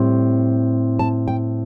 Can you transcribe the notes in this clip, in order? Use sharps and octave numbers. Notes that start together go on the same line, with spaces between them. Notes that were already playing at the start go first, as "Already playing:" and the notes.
Already playing: A2 G3 C4
A5
G5